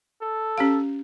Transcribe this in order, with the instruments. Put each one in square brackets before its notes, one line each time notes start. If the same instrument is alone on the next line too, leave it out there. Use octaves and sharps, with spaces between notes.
[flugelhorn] A4
[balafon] C#4 G4 F5